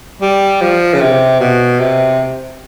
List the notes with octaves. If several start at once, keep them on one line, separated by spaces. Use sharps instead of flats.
G3
F3
C#3
C3
B2
C3